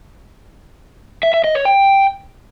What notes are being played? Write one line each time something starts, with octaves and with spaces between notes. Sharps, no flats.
E5
E5
D#5
C#5
G5